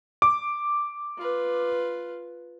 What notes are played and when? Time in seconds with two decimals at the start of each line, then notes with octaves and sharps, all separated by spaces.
0.22 D6
1.18 F4 B4